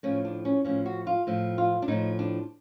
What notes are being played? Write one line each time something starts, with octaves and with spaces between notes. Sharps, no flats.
A2 F3 C#4
D4
C#4
A2 F3 C#4
F#4
F4
A2 F3
F4
D4
A2 F3 D#4
D4